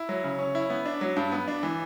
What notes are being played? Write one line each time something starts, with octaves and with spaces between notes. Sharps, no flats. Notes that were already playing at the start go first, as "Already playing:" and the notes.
Already playing: E4
F#3
C#3
C#4
E4
B3
D4
F#3
G2
B3
D4
E3